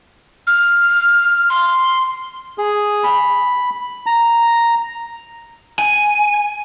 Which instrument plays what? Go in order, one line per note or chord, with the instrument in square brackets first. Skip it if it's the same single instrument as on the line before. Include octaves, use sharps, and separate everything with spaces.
[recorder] F6
C6
[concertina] G#4
B5
A#5
[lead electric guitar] G#5